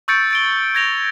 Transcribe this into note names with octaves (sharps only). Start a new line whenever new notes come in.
C#6 E6 G6 A6 C#7 D7
A6 D7 G7
G#6 A#6 F7 G7